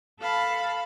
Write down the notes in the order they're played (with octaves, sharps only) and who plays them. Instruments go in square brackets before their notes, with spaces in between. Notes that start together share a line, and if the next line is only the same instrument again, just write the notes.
[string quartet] A4 F5 A5 B5